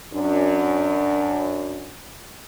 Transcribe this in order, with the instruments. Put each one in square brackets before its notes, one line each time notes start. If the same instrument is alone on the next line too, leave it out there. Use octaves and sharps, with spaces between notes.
[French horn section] F#2 D4